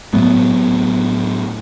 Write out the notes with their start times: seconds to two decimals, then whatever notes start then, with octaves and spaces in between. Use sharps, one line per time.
0.14 A2 F#3 A3 B3